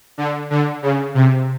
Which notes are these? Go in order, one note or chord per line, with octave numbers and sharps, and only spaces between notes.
D3
D3
C#3
C3